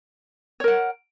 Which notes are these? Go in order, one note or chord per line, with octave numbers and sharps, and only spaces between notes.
A#4 C#5 F#5